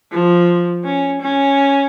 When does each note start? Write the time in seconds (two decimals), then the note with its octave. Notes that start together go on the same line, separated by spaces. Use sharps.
0.11 F3
0.84 C#4
1.22 C#4